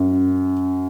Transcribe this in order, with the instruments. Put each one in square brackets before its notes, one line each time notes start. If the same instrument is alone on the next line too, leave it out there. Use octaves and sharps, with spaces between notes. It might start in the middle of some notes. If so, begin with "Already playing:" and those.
Already playing: [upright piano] F#2